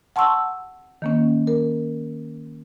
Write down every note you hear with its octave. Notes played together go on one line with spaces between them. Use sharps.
F#5 A5 C6 C#6 E6
D#3 A#3 C#4
A#4